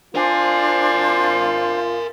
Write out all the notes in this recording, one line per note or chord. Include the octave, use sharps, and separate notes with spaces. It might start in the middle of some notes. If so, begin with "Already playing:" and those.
D4 F4 A#4 C5 G#5